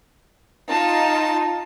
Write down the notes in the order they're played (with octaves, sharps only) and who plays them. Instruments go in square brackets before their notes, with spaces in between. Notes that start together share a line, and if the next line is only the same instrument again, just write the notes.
[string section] D#4 F4 [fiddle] A5